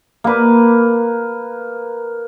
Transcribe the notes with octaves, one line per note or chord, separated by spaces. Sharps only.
A#3 B4